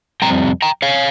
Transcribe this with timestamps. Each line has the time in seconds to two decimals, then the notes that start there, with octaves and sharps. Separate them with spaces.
0.22 F2 C3 G3 C4 G5 A#5
0.62 G5 A#5
0.82 C#5 F5